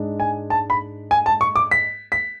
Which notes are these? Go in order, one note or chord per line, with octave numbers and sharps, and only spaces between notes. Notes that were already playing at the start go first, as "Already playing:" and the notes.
Already playing: G#2 G#3 D4
G#5
A5
B5
G#5
A5
C#6
D6
B6
B6